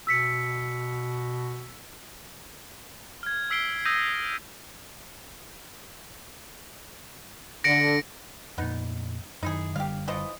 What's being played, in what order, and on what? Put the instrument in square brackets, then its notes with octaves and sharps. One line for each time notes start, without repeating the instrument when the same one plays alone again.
[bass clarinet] B2 [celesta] E6 B6 C#7
[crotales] F6 G#6
E6 B6 C7 D7 G7
D#6 E6 G6 A#6 D#7
[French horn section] D3 [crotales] A#6 C#7 D7
[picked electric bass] F2 A#2 [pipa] B3 D#4
[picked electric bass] F#2 D#3 [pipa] D#4 E4 G#4
[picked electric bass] F#1 D3 G3 [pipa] G4 F5
[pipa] E3 F3 D#5